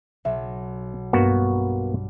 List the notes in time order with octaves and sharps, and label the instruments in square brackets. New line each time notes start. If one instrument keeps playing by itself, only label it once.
[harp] B1 [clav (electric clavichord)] E5
[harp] G2 [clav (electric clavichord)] A#3 B3 F#4